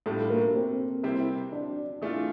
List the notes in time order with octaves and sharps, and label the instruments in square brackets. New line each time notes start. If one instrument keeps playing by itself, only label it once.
[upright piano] A2 G3 D4 F4 [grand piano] A4
[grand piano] A#3 A#4
C4 C5
[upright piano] C3 G3 C4 E4
[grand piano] D4 D5
[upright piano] E3 A3 D4 F4